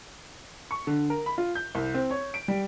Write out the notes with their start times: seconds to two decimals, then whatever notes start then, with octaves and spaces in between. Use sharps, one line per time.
0.71 C#6
0.87 D3
1.10 A#4
1.26 B5
1.38 F4
1.55 G6
1.75 C2
1.94 C4
2.11 C#5
2.34 D7
2.48 G3